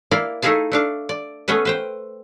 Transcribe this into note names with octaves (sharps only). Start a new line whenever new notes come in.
A#3 E4 D5 F5
A3 D#4 E4 G#4 F5 A5
A3 D4 F5
D5
A3 B3 C#4 G#4 B4
B4 C5 G5